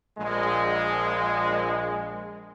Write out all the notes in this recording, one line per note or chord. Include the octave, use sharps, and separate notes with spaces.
A#1 G#3